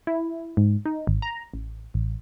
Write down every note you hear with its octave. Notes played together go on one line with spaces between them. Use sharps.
E4
G#2
D#4
G#1
A#5
A1
A1